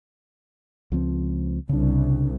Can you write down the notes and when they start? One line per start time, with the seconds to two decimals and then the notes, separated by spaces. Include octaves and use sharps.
0.92 C#2 F3 C4
1.69 C2 C#3 D4